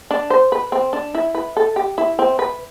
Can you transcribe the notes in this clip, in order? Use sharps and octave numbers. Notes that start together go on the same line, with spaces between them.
D4
C5
B4
C4
D4
E4
B4
A4
G4
E4
C4
B4